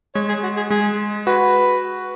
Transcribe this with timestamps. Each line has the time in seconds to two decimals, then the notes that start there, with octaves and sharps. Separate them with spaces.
0.15 G#3 C#5
0.29 G#4
0.43 F#4
0.57 G#4
0.70 G#3 G#4
1.27 F#4 B4